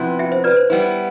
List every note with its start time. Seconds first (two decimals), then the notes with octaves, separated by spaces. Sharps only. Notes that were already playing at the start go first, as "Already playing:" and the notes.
Already playing: C3 F3 B3 E4
0.19 E5 G5
0.32 C5 E5
0.44 B4 D5
0.57 C5
0.70 G3 B3 E4